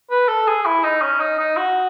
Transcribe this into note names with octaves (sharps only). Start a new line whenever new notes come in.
B4
A4
G#4
E4
D#4
C#4
D#4
D#4
F#4